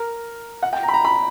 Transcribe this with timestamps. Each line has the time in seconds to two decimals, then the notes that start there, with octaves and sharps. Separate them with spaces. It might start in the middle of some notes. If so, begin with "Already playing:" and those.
Already playing: A#4
0.63 F#5
0.73 G5
0.83 A#5
0.88 B5
0.94 A#5
1.05 B5